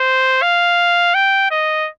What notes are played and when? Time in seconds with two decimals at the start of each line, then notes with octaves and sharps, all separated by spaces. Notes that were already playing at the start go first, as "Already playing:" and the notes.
Already playing: C5
0.42 F5
1.15 G5
1.51 D#5